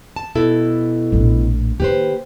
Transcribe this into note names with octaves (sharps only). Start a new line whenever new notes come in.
A5
B2 E4 A4
A#1 A2
D#3 A#3 G4 B4 C5